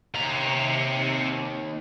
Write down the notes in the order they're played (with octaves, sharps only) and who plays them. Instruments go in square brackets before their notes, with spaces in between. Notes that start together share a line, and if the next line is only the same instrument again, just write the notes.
[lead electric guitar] D#2 [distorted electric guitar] C3 A#5